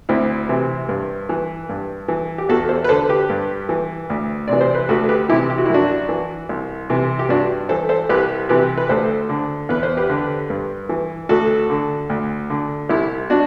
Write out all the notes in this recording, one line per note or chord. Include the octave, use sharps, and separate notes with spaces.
D2 C4 E4
C3 E3
G2
E3
G2
E3
G4
E2 F#4 A4
A4 C5
B4
D3 A4 C5
G4 B4
G2
E3
D2
C3 E3 D5
C5
B4
D2 F#4 A4
G4 B4
C3 E3 E4 G4
G4
F#4
E4
F#2 D4 F#4
E3
C2
C3 E3
G4
G2 D4 F#4
E3 A4 C5
A4 C5
C2 G4 B4
C3 E3 G4 B4
B4
D2 A4 C5
D3
E2 B4
C5
G4 B4
D3
G2
E3
D2 F#4 A4
D3
D2
D3
C2 E4 G4
B2 D4 F#4